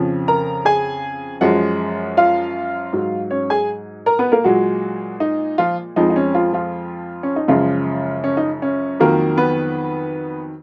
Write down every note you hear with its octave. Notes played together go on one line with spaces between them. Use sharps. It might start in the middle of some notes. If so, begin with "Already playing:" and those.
Already playing: F2 C#3 F3
A#4 A#5
G#4 G#5
F#2 F3 G#3 F#4 F#5
F4 F5
G#2 F#3
C#4 C#5
G#4 G#5
A#4 A#5
B3 B4
A#3 A#4
A#2 F#3 G#3 F#4
D#4
F3 F4
F2 F3 G#3 D#4
D#4
C#4
F3 F4
F3 F4
C#4
D#4
F#2 C#3 F3 G#3 F4
C#4
D#4
C#4
F2 D#3 F#3 A#3 A#4
B3 B4